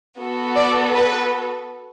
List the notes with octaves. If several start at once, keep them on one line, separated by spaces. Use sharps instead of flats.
B3 F#4 A4
D5
B4